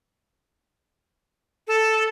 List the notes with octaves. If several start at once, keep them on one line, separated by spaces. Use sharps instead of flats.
A4